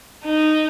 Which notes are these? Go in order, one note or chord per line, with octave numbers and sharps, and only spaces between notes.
D#4